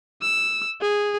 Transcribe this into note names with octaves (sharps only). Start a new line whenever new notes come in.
E6
G#4